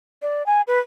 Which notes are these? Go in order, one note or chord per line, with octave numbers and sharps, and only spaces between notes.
D5
G#5
B4